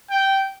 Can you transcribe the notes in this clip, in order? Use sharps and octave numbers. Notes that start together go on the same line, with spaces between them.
G5